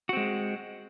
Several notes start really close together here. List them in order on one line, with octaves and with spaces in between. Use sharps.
F#4 C4 G#3